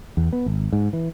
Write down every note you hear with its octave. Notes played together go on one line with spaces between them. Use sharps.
E2
B3
G#1
G#2
E3